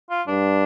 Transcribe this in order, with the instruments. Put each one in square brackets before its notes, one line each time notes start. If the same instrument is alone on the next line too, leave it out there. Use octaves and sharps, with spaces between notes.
[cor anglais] F4
[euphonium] G2 [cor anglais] D4